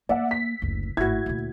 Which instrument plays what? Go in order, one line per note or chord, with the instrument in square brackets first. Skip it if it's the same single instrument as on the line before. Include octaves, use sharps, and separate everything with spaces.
[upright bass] A#3 [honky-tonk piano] D5 E5 F#5
[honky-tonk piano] B6
[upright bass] F#1 D2
[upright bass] G#1 A2 [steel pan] E4 F#4 [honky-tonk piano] G#6
[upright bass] D2 A#2